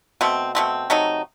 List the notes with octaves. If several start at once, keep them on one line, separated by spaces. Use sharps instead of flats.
B2 A3 C4
B2 A3 C4
C3 F#3 A3 D#4